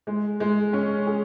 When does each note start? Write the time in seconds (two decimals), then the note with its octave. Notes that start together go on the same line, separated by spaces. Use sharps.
0.07 G#3
0.40 G#3
0.73 C#4
1.07 G#4